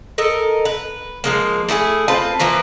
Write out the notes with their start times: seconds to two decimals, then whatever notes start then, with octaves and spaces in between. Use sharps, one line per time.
0.18 A4 A#4 D#5
0.65 B4
1.24 F3 G#3 A#3
1.69 A3 E4 F4 G#4
2.08 C4 F4 B4 A5
2.40 E3 F3 A#3 B4